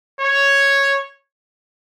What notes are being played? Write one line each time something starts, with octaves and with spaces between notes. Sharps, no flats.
C#5